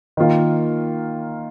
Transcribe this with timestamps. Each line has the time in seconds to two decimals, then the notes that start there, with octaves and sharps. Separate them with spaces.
0.17 D#3 A#3 F4